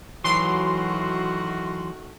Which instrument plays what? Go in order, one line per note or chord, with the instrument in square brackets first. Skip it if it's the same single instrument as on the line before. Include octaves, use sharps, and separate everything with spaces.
[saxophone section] D#3 A3 F#4 [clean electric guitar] E3 F#3 [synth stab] C6